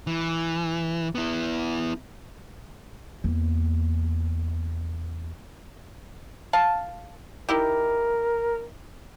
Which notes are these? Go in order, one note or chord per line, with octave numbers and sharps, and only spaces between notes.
E3
B3 E4
E2 A#3
F5 A5
D#4 E4 G4 A#4